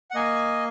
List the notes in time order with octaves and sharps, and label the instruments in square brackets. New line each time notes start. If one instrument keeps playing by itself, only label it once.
[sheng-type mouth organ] F#5
A#3 D#5 G#5